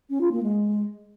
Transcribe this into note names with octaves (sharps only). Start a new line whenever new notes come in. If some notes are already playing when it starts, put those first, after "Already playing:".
C#4
F4
A#3
G#3